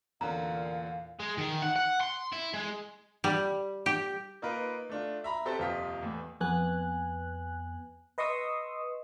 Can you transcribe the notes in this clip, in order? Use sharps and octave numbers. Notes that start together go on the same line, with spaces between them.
E2 A#2 D3 C#4 F5 A#5
G#3
D#3
F#5
F#5
C6
E4
G#3
G3
G4
A#3 D#4 F4 A#4 B4
A3 D4 F4
E5 A#5 B5
C4 G4 A4 B4 C5
D#1 F2 C3 F4 D#6 B6
E2 A2
F2 B3 G#5 F#6
B4 D#5 C6 C#6 D#6 E6